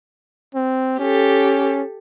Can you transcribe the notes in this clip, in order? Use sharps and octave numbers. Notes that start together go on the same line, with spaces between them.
C4
C#4 G4 A4